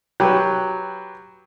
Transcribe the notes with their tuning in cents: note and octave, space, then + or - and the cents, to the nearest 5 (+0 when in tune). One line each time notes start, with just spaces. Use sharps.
F#3 +0 G4 +5 B4 +0